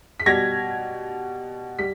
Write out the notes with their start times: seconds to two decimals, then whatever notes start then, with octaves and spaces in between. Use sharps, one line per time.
0.20 B6
0.26 B2 G3 G#6 A#6
1.79 G3 B6